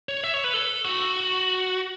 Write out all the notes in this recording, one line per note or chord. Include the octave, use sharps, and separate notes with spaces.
C#5
E5
C#5
B4
A4
F#4